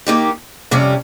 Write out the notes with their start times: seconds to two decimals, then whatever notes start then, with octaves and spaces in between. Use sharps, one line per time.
0.07 D#3 A#3 D#4 G4
0.71 F2 C3 G3 C#4